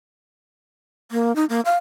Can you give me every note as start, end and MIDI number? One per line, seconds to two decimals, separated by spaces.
1.12 1.35 58
1.36 1.45 63
1.49 1.61 58
1.65 1.76 77